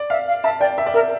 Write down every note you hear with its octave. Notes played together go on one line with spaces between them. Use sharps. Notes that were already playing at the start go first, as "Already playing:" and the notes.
Already playing: D5
E5 F5
F5
E5 A5
D5 G5
E5
D5
A#4 E5